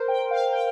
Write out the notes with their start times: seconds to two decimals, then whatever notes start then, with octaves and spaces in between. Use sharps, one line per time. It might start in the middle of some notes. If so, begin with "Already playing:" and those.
Already playing: A#4 C5
0.08 G5
0.31 F5
0.53 G5